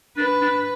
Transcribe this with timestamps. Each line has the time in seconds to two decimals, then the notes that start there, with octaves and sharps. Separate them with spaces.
0.17 D4 B4
0.41 D4